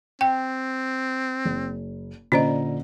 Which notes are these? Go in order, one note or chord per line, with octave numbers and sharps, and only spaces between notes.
C4 G5
F#1
A#2 D3 C#4 C5 D#5 A#5